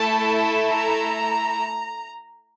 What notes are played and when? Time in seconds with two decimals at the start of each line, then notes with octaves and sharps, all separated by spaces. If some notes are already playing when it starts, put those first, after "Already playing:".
Already playing: A3 E4 A4 A5
0.68 A#5